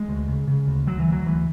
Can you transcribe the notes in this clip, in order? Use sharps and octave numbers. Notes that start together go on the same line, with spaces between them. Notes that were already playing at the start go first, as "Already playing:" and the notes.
Already playing: G#3
D2
C#3
C#3
D2
D2 F#3
E3
D2
F#3
D2 E3